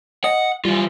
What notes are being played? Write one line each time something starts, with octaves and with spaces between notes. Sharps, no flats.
D#5 F#5
E3 G3 F4